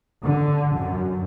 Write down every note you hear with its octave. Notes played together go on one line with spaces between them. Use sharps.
D3
F#2